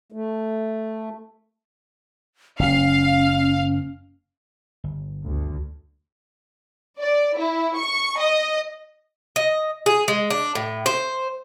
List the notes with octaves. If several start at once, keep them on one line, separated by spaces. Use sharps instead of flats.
A3
F#1 C#4 F5
G1
D2
D5
E4
C#6
D#5
D#5
G#4
G#3
D4
A2
C5